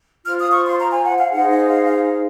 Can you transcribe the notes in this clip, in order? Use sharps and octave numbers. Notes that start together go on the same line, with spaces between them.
F4 C5 F6
D#6
C#6
C6
A#5
G#5
F#5
F5
D#4 G#4 C5 F#5
D#5
F5
F5